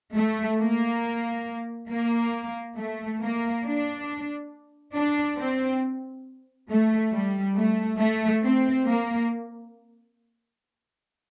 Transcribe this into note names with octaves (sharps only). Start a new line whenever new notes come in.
A3
A#3
A#3
A3
A#3
D4
D4
C4
A3
G3
A3
A3
C4
A#3